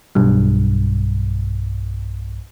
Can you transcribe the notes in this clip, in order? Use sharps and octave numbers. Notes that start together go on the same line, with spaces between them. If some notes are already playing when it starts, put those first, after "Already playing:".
B1 G2